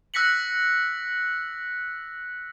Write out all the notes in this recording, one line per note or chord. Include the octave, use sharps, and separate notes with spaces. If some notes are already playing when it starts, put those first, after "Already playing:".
E6 F#6 A#6 B6 C#7 F#7